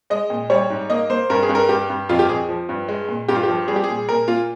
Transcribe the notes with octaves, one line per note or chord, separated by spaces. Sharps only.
G#3 D#5
A#2
G3 C#5
G#2
A#3 D#5
A#3 C5
G2 A#4
G#4
G2
A#4
G2 G4
G2
F2 F4
G4
F2 G#4
F3
G2
G#3
A#2
G2 G4
F4
F3 G4
G3 G#4
G4
A#2 G#4
A#2 A#4
A#3 F4